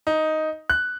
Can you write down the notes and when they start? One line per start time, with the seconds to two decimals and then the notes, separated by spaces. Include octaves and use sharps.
0.07 D#4
0.70 F#6